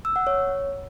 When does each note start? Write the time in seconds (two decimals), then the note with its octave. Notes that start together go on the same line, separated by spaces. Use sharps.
0.05 E6
0.16 F#5
0.27 C#5